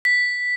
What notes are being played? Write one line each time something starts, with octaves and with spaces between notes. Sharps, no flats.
B6